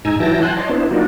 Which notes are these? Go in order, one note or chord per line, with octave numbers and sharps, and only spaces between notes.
G#2 D#4 G#5 A#5 E6
E3 F#3 E4 G5 A5 A#6
F#5 G#5 A5 C6 F#6 G6
C#5 D#5 A5 C6 D6
B3 D4 E4 C5
F#3 A#3 D4 D#4 F4 F#4